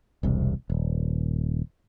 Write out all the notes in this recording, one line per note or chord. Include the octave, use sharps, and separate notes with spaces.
E1 C2 C3
D#1